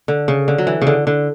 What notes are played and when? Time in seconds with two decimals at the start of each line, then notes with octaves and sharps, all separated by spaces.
0.08 D3
0.28 C#3
0.48 D3
0.58 F#3
0.67 E3
0.82 C#3
0.87 D3
1.07 D3